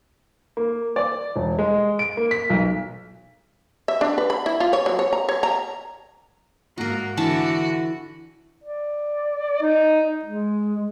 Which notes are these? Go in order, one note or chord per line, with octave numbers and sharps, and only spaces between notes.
A#3
D5
E1
G#3
D7
A#3
B6
B1
E5
D4
B4
B5
E4
F4
C#5
F#3
C#5
A#5
C#5
A#5
G#2 A#3 F#4 A#4
D3 E3 D4 F#4 A5
D5
D#4
G#3